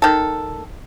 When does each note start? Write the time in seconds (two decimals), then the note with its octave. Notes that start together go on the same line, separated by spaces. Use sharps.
0.02 D#3 A4